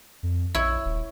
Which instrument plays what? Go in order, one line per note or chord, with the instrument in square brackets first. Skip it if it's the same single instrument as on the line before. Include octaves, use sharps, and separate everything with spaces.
[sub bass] F2
[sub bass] A#1 [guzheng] E4 C#5
[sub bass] D#1